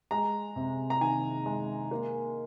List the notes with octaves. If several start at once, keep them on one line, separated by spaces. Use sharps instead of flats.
G#3 A#5
C3
A#5
D#3 G#5
G#3
A#3